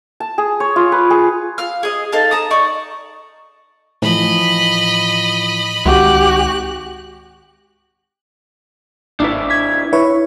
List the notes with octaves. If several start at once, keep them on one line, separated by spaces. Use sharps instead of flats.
A5
G#4
C#5
F4
B4
G#4
F5 F6
G#4 D#5
D#4 A4 F5 A5
A5 A#5 D#6
D#4 D5 C#6
A2 E3 F3 D#5 B5
G#1 C#2 F#4 G4 F#6
G#1 D4 E4 B4
G#6 B6
E4 B4 C#5